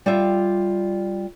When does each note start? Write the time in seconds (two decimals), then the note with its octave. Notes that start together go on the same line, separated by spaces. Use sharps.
0.06 G3 F4 G4 E5 F5 G5